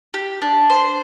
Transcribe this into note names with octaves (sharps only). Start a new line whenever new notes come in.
G4
D4
C5